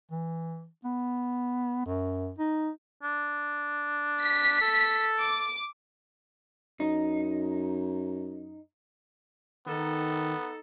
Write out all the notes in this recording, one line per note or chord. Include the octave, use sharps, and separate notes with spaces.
E3
B3
F#2
D#4
D4
B6
A4
D6
F#2 D#4
D#3 B3 D#4 A4